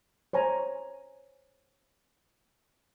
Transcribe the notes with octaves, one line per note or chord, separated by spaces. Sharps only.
C5 C#5 G#5 A#5